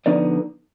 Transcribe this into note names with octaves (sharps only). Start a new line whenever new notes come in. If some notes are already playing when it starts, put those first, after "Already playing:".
D3 F3 B3 D#4 D5